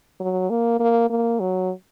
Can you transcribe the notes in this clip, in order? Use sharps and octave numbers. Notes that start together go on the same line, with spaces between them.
F#3
A#3
A#3
A#3
F#3